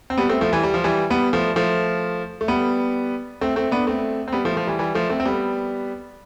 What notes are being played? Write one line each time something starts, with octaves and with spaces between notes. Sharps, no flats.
C4
G3 B3
A3 C4
F3 A3
E3 G3
G3
F3
E3 G3
G3 B3
F3 A3
F3 A3
A3
G3 B3
A3 C4
A3 C4
B3 D4
A3 C4
C4
G3 B3
F3 A3
F3 A3
E3 G3
E3 G3
F3 A3
A3 C4
C4
G3 B3